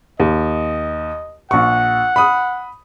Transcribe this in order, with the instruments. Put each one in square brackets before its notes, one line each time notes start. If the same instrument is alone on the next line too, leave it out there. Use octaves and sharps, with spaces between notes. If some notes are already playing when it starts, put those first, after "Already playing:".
[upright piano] D#2 [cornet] D#5
[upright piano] A#1 C#6 [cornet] F#5
[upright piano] B5 D#6